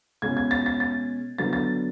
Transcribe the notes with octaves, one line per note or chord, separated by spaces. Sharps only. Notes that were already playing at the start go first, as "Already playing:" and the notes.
B2 G#3 C#4 G#6
G#6
A6
A6
A6
D3 F#3 B3 A6
A6